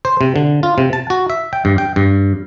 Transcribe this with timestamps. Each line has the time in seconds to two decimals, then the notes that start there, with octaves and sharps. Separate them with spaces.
0.05 C5
0.21 C3
0.36 D3
0.63 F4
0.78 C3
0.93 A5
1.10 F#4
1.30 E5
1.53 G5
1.65 G2
1.78 G5
1.96 G2